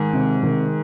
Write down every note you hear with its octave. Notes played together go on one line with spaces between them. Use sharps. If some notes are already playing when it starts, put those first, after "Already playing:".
Already playing: G#2 D#3
C3
D#3